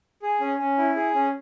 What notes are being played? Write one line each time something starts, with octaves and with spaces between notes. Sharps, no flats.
G#4
C#4
C#4
E4
G#4
C#4